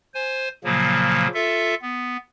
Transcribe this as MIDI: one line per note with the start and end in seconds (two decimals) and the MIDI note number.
0.14 0.48 72
0.14 0.48 80
0.64 1.27 46
0.64 1.27 49
0.64 1.27 53
0.64 1.27 54
0.64 1.27 58
1.34 1.74 65
1.34 1.74 69
1.34 1.74 76
1.82 2.17 59